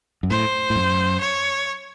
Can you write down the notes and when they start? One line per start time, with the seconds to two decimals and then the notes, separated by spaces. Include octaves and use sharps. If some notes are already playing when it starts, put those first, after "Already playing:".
0.23 F#2
0.30 A2 C5
0.70 A2
0.76 F#2
1.21 C#5